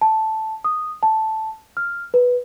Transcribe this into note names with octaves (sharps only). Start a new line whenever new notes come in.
A5
D#6
A5
F6
B4